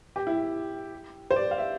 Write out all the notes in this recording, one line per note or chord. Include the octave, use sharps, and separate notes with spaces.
G4
E4
C5
D5
F5
E5